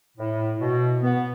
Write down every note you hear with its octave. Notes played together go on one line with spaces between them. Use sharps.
A2
B2
B3